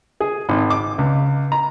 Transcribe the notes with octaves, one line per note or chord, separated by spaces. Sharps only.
G#4
G#1
D6
C#2
A#5